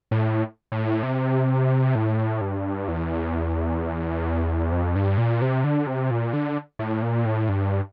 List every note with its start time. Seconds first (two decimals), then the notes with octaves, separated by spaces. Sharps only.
0.11 A2
0.72 A2
1.03 C3
1.95 A2
2.41 G2
2.88 E2
4.72 F2
4.96 G2
5.18 A#2
5.42 C3
5.64 D3
5.87 C3
6.11 A#2
6.33 D3
6.79 A2
7.02 A#2
7.25 A2
7.49 G2